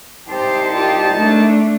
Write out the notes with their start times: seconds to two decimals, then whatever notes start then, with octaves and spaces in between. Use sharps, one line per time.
0.28 C2 D#4 G4 C5 A5
0.74 F4 G4
1.14 A3 D4